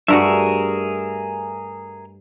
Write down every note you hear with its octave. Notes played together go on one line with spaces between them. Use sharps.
G2 A3 F#4 G#4 A#4 E5